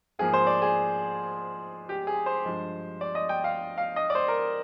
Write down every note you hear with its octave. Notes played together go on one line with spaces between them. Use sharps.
G#2 F3 A#3 G#4
C5
D5
G#4
G4
G#4
C5
G2 F3 G#3
D5
D#5
G5
F5
F5
D#5
D5
C5
A#4